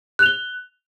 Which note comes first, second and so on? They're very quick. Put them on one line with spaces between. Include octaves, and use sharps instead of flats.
F#6 F7 G7